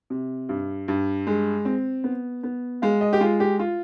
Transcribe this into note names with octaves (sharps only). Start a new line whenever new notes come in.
C3
G2
G2
G#3
C4
B3
B3
G#3 F5
D#5
G4
G#3 F4
G4
F4